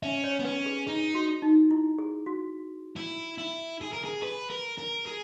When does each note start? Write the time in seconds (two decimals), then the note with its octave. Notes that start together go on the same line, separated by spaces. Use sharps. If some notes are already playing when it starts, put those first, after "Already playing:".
0.02 C#4 E5
0.24 C#5
0.39 B3
0.45 C#4 B4
0.66 G#4
0.87 D#4 G#4
1.15 F#4
1.42 D#4
1.71 E4
1.99 G#4
2.26 F#4
2.97 E4
3.38 E4
3.81 G#4
3.93 A#4
4.04 G#4
4.22 G#4 B4
4.50 A#4
4.78 A#4
5.06 G#4